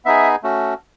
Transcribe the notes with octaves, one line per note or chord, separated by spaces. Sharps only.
B3 D#4 G#4 E5
A3 C#4 F#4